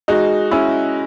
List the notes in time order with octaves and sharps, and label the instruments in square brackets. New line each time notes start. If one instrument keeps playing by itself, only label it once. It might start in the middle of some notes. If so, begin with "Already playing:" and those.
[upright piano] G#3 D#4 F#4
C#4 E4